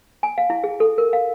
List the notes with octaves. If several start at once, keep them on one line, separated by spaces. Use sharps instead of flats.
G#5
F5
E4
G#4
A4
A#4
F5